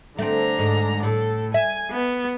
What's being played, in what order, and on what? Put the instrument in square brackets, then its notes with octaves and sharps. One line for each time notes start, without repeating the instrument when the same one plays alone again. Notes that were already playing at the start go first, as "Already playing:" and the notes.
[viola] D3 A#5 [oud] A3 C4
[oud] G#2
[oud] A2 [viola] A4
[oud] E5 [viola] G#5
[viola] B3